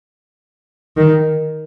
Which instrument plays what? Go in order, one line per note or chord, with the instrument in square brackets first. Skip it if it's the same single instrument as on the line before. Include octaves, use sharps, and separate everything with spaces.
[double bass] D#3